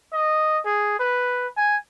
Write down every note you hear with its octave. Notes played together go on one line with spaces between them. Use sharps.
D#5
G#4
B4
G#5